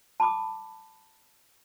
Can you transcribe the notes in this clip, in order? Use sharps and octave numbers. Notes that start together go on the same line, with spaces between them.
A5 B5 D6 D#6